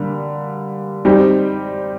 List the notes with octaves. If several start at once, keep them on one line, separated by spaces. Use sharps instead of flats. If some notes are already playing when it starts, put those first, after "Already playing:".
Already playing: D3 G3 A#3
G3 C4 D#4 G4